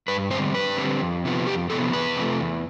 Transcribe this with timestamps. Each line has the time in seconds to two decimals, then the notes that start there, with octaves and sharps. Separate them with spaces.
0.08 G2 B4
0.31 D3 G3 C4 C5
0.54 G2 B4
0.77 D3 G3 C4
1.00 F2
1.24 C3 F3 B3
1.47 F2 G4
1.70 C3 F3 B3 A4
1.93 E2 B4
2.17 C3 F3 A3
2.40 E2